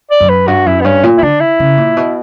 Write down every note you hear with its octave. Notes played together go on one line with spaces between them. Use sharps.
D5
F#2
B4
G2 F#4
F#2 E4
B3
G2 C#4
A#2
E4
D3 D4
E4
C#3
A#2
B2